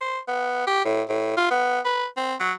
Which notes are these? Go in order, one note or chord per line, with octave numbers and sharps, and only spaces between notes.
C5
B3
G4
A2
A2
F4
B3
B4
C4
F#3